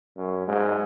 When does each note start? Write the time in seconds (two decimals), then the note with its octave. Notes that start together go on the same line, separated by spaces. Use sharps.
0.17 F#2
0.48 G#2